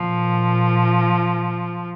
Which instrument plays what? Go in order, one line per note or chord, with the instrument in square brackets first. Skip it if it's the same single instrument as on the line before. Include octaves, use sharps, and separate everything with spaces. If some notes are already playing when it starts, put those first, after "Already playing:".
Already playing: [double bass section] A#2 [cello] F3